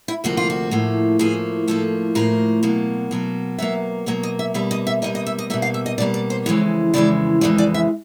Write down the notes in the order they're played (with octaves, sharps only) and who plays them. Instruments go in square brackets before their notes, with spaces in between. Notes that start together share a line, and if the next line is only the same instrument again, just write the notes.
[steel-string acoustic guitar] E4
D2 C3 F3 A#3 F#4
F4
F#4
A2 F3 A#3
A2 F3 A#3 G#4
A2 F3 A#3 A4
A2 F3 A#3 A#4
B2 F#3 A#3
B2 F#3 A#3
B2 F#3 A#3 E5
B2 F#3 A#3 C#5
D#5
E5
B2 G3 A#3 E5
D#5
E5
B2 G3 A#3 D#5
D#5
E5
D#5
B2 G3 A#3 E5
F5
E5
D#5
B2 G3 A#3 D5
D5
C5
F2 C#3 E3 G#3 C#5
F2 C#3 E3 G#3 D5
F2 C#3 E3 G#3 D5
D5
E5